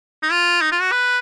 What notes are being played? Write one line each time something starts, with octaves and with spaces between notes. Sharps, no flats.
D#4
F4
D#4
F4
F#4
B4